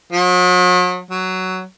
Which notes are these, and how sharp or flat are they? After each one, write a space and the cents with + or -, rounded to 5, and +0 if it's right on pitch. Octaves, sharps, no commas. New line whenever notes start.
F#3 -40
F#3 +10